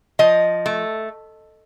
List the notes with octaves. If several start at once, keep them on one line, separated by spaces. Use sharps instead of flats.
F3 D#5
A3